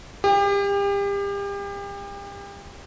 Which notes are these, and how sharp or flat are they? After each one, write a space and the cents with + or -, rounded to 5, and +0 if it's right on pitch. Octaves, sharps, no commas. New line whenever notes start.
G4 +35